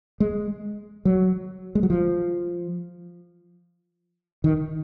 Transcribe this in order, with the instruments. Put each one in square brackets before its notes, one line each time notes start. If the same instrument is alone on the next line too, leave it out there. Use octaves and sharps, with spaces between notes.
[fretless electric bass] G#3
F#3
G#3
F#3
F3
D#3